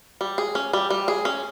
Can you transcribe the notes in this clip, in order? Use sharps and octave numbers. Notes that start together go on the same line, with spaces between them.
G3
G#4
C#4
G3
G3
G#4
C#4